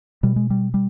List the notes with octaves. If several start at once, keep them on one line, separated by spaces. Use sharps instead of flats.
B2 G3
G#3
G3
G3